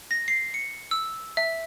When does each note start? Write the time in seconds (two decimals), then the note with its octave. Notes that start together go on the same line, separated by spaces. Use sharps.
0.11 A#6
0.28 C7
0.54 C#7
0.91 E6
1.37 E5